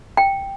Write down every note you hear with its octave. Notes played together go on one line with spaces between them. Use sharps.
G5